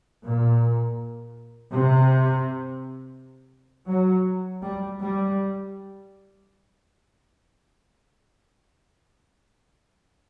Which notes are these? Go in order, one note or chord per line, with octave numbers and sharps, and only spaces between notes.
A#2
C3
F#3
G3
G3